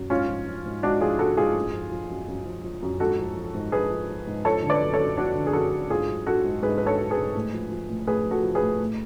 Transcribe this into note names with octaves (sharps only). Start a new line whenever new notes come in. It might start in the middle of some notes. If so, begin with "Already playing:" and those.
Already playing: F#2
G#2 C#4 F4
F3
F3
G#2
G#2 D4 F#4
F3 F4 G#4
F3 F#4 A4
G#2 F4 G#4
F#2
F3
F3
F#2
F#2
F3
F3
F#2
G#2 F#4 A4
F3
F3
G#2
G#2 G#4 B4
F3
F3
G#2
F3 A4 C#5
D3
B4 D5
F#2
A4 C#5
F#2
F3 D4 F#4
D3
G#4
F#2 F#4 A4
F#2
G#2 F4 G#4
F#3
F#3 F#4 A4
G#2
G#2 G#4 B4
F#3 B4
A4 C#5
F#3
G#4 B4
G#2
A2
F3
F3
A2
A2 G#4 B4
F3
F#4 A4
F3
G#4 B4
A2
A2